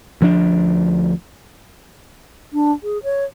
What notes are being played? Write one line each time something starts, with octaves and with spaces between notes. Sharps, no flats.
D2 F3 A3 D4
D4
G#4
C#5